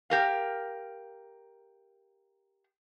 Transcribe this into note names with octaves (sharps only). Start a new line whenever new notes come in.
G4 A#4 F5